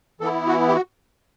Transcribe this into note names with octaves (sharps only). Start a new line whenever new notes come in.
E3 B3 E4 A4
F#4
G4
F#4